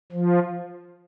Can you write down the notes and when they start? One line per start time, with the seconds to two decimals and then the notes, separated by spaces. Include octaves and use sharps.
0.12 F3